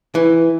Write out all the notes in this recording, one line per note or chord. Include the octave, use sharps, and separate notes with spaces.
E3